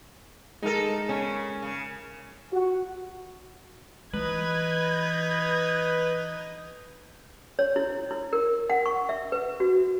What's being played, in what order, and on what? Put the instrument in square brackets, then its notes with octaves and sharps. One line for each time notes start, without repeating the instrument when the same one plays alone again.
[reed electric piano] G#3 A#4 [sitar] D#4 A4
[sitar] C#3 [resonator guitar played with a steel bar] C#4
[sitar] C#3
[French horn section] F#4
[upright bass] E3 [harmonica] D#4 [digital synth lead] B4 [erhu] G#6
[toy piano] C#5
E4
E4
A#4
F#5
C#6
E5
B4
F#4